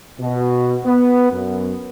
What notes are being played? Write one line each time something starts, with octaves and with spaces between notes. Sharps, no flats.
B2
B3
F#2